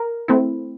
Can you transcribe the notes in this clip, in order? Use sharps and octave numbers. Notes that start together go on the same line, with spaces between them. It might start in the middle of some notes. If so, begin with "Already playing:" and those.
Already playing: A#4
A3 C4 E4